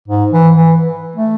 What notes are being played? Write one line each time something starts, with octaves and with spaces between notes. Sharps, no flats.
G#2
E3
E3
A3